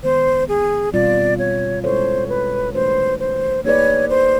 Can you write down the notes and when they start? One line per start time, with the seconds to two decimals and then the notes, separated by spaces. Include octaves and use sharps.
0.03 D#3 G#3 B3 C5
0.49 G#4
0.93 B2 G3 C4 F4 D5
1.39 C#5
1.84 G#3 C#4 E4 A4 C5 C#5
2.29 B4
2.74 E3 A3 D4 F#4 B4 C5
3.20 C5
3.64 A#3 D#4 G#4 B4 C#5 D5
4.10 C5